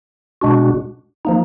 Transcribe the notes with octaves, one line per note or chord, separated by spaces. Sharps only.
B2 G#3 D4 F#4
F3 A#3 D#4